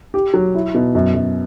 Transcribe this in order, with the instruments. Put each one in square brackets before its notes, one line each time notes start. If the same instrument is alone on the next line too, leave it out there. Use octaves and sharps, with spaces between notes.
[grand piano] G4
F#3
E4
B2
F#2
F#2